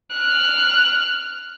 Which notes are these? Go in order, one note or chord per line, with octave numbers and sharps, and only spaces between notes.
F6 F#6